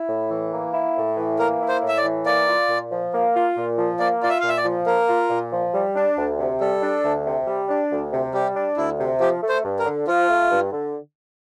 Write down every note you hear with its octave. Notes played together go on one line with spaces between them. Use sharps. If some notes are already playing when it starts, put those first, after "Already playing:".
Already playing: E4
A2
E3
A#3
E4
A2
E3
A#3 A#4
E4
C5
A2
E5
D5
E3
A#3 D5
F4
A#2
F3
A#3
F4
A#2
F3
A#3 D5
F4 D5
E5
A#2 F5
E5
D5
F3
A#3 A#4
F4
A#2
F3
G3
D4
D2
C3
G3 A4
D4
D2
C3
G3
D4
D2
C3
G3 G4
D4
D2 E4
C3
F3 G4
A3
C5
G2
A#4
D3
F3 F4
A3
G2
D3